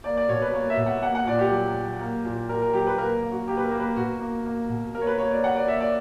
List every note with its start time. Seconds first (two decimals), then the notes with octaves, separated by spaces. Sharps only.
0.04 A#3 D5
0.17 D5
0.29 B2 C#5
0.42 B4
0.53 A#3 C#5
0.70 E5
0.77 B2
0.86 F#5
1.02 A#3 F#5
1.15 F#5
1.26 A#2 D5
1.39 G4
1.51 F#3
1.76 F#3
2.00 A#3
2.25 A#2
2.49 A#2 A#4
2.61 A#4
2.73 F#3 G4
2.87 B4
2.98 A#3 A#4
3.23 A#3
3.31 F#4
3.47 A#3 G4
3.57 B4
3.64 A#4
3.71 A#3
3.79 B4
3.96 B2 F#4
4.20 A#3
4.46 A#3
4.69 B2
4.94 A#3 A#4
5.01 C#5
5.07 B4
5.18 A#3 C#5
5.31 D5
5.43 A#3 F#5
5.56 D5
5.68 A#3 E5
5.80 D5